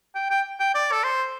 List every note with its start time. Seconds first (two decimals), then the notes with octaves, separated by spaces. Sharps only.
0.15 G5
0.30 G5
0.60 G5
0.74 D5
0.92 A4
1.04 C5